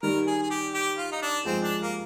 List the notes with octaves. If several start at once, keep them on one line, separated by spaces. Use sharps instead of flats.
D#3 G3 A#4
G#4
G#4
G4
G4
F4
D#4
D4
F3 G#3 C4
D4
A#3